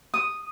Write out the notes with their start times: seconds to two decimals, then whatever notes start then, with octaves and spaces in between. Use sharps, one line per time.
0.14 D#6